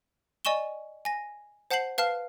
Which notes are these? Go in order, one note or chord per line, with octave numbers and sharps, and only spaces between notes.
D5 D#5 G#5 C#6 E7 G7
G#5 A#6
C5 F#5 A5 G6 C7 F#7
B4 F5 A5 F6 C7